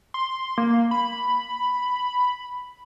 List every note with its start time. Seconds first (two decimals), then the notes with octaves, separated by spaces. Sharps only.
0.14 C6
0.58 A#3
0.91 B5